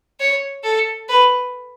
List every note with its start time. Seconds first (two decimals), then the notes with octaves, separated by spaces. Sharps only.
0.20 C#5
0.64 A4
1.09 B4